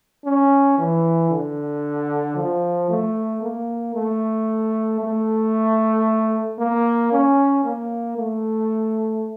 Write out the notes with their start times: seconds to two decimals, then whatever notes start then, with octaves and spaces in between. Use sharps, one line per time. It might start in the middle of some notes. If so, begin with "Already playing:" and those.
0.25 C#4
0.78 E3
1.30 D3
2.36 F3
2.90 A3
3.42 A#3
3.95 A3
5.00 A3
6.59 A#3
7.12 C#4
7.64 A#3
8.18 A3